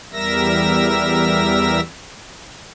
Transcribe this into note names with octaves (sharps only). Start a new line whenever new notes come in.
E2 G3 A#4 E5 E6 A#6